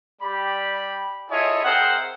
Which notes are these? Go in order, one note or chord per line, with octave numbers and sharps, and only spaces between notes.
G3 G4 D5 B5
E4 F4 G#4 A4 C#5 D#5
C4 G#4 A#4 C5 E5 F#5